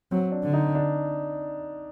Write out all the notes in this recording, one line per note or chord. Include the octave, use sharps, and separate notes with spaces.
F#3 C4
D4
D3
D#4
D4